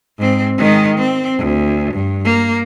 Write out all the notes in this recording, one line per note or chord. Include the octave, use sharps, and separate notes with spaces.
G#2 C4
D#3 G#3
C4
D2
G2
A#3